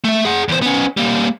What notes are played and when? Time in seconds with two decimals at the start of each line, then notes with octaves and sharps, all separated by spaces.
0.04 A3 E5
0.25 G#4 F#5
0.48 E2 C5
0.62 B3 C#4
0.97 G3 A#3